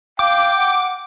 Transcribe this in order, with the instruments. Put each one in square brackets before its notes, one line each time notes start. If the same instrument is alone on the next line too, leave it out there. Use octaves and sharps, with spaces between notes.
[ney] F5 [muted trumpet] G5 [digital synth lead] D6
[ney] F#5